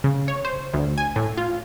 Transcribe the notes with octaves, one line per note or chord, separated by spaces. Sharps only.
C#3
C#5
C5
D2
G#5
A2
F4